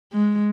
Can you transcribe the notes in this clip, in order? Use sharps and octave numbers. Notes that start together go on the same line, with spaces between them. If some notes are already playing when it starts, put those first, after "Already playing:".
G#3